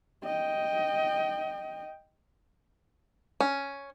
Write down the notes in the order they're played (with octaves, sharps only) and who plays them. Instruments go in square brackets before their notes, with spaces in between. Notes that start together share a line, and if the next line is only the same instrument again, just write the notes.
[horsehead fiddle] D#5 G5
[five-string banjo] C#4